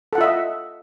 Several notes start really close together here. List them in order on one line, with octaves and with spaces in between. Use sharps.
A4 F#5 F4 E5 D#5